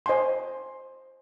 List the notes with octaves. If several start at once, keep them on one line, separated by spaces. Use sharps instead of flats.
C5 D#5 G#5 C6